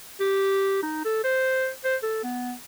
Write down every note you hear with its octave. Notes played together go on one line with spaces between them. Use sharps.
G4
D#4
A4
C5
C5
A4
B3